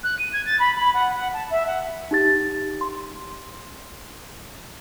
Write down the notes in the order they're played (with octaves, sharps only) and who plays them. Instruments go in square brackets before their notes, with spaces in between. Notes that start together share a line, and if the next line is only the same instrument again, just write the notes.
[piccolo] F#6
D#7
G#6
A6
B5
B5
F#5
F#5
A5
E5
F#5
[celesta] D#4 G4 A6
C6